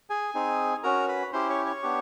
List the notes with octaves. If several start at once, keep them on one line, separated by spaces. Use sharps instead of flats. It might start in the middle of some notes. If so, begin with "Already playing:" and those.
G#4 G#5
C4 D#4 G#4
C#4 F#4 A#4 A#5
B4 B5
C#4 E4 G4 C5 C6
C#5 C#6
C#5 C#6
B3 D4 G4